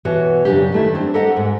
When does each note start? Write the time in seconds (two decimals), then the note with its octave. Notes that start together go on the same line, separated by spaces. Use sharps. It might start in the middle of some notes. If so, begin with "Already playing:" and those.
0.05 B2 E3 F#4 C#5
0.45 F#2 C#3 D4 G4
0.72 D#3 A3 E4
0.94 C4 D4 C5
1.14 G4 A4 A#4 D#5 F#5
1.36 G#2